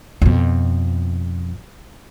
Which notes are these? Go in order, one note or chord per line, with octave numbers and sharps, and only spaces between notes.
F2 B2